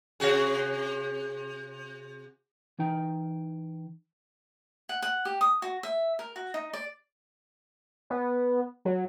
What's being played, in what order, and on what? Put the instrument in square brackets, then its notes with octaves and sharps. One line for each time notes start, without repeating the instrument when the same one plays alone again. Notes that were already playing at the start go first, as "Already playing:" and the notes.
[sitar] C3 F#4 G#4
[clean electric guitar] E3 D#4 G5
[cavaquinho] F#5
F#5
G4
D#6
F#4
E5
A#4
F#4
D#4
D5
[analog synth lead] B3
F#3